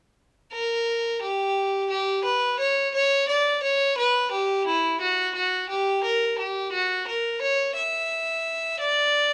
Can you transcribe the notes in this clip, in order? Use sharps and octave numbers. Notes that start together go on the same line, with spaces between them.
A#4
G4
G4
B4
C#5
C#5
D5
C#5
B4
G4
E4
F#4
F#4
G4
A#4
G4
F#4
A#4
C#5
E5
D5